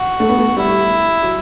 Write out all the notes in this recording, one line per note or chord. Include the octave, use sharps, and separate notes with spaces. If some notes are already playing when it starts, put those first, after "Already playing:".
Already playing: F#4
A3
B3
A3
G3 E4
F#3